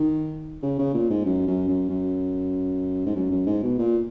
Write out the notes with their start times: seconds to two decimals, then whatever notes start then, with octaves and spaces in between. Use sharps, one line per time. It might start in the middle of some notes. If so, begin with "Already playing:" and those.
Already playing: D#3
0.63 C#3
0.79 C#3
0.94 A#2
1.10 G#2
1.25 F#2
1.47 F#2
1.68 F#2
1.89 F#2
3.06 G#2
3.16 F#2
3.31 F#2
3.46 G#2
3.63 B2
3.79 A#2